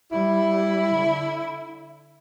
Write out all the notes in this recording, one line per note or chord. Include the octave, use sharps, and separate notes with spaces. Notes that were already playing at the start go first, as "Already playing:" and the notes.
G3 E4
D3